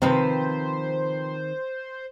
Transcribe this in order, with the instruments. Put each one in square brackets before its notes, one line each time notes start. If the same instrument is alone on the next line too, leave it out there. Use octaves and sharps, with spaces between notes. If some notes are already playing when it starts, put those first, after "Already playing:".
[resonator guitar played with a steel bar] C3 F3 B4 [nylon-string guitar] D#3 C4 [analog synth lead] C5